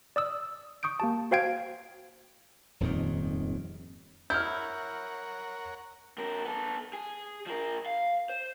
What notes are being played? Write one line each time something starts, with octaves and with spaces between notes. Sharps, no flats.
D5 D#6 E6
C#6 D#6 G6 D7
A#3 G4 A5
F#4 C5 F5 G5 G#6 D7
D#1 F2 G#2 D#3
E4 A#4 C#5 F#5 F6 G6
F2 A#4
B3 A4
G#4
F3 A#4
F5
C5